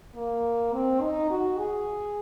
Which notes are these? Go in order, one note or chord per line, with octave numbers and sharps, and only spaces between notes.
A#3
C4
D#4
F#4
G#4